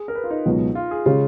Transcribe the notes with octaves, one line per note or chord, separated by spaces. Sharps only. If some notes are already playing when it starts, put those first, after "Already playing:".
Already playing: G#4
A#4
B4
F4
D#4
C#2 B2 F#3 B3
F4
G#4
C#3 G#3 F4